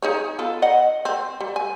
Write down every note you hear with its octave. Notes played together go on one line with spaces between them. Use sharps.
D#4 G#4 C#5
B3 F4 A4
D#4 D#5 F#5
C4
G3
G#5